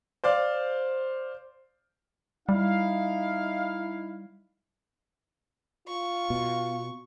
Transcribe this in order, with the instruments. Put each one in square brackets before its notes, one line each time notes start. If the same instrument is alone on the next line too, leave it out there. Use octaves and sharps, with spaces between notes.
[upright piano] C5 D5 F5
[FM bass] G3 [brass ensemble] D#4 E4 F5
[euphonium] F4 [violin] C#6
[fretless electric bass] B2